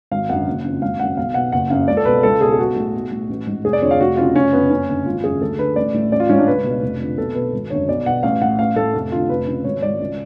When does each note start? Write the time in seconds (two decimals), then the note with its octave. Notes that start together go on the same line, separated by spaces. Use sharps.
0.12 G#1 F5
0.29 F#2 D3 F#5
0.47 F#1
0.64 F2 C#3
0.82 G#1 F5
0.99 F#2 C#3 F#5
1.17 B1 F5
1.34 B2 F#5
1.52 F#1 F#5
1.70 F#2 C#3 F5
1.88 C#2 D5
1.97 A4
2.05 B2 B4
2.23 C#2 A4
2.41 B2 G#4
2.52 G#4
2.59 B1 F#4
2.76 A2
2.94 B1
3.12 A2
3.29 A1
3.47 G#2
3.64 F1 G#4
3.73 D5
3.82 F2 D3 C#5
3.91 F5
4.00 F1 F#4
4.17 F2 C#3 F4
4.35 F1 C#4
4.53 F2 C#3 B3
4.70 F#1 C#4
4.89 F#2 D3
5.06 G#1 F4
5.24 F#2 C#3 G#4
5.41 D2 A4
5.59 D3 B4
5.76 A1 D5
5.94 A2
6.12 A1 D5
6.20 F4
6.29 G#2 C#4
6.38 D4
6.47 C#2 B4
6.64 B2
6.82 F1
7.00 F2 D3
7.18 B1 A4
7.35 B2 B4
7.53 G#1
7.70 F#2 D3 C#5
7.88 B1 D5
8.06 B2 F#5
8.23 A1 F5
8.41 A2 F#5
8.59 A1 F5
8.76 A2 A4
8.94 F1
9.12 F2 D3 F4
9.29 F1 B4
9.47 F2 C#3
9.64 G#1 C#5
9.82 G#2 D5
10.00 C#2